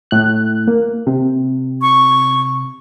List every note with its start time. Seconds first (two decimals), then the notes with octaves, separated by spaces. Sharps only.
0.11 A2 F#6
0.67 A#3
1.07 C3
1.82 C#6